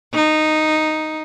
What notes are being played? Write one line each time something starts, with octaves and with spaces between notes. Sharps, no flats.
D#4